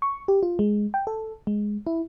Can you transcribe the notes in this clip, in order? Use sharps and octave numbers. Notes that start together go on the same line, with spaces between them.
C#6
G4
F4
G#3
G5
A4
G#3
E4